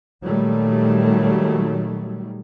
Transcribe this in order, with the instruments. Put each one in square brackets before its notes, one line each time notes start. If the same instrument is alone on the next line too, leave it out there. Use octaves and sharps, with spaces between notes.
[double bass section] A#2 D#3 F#3 G3 A3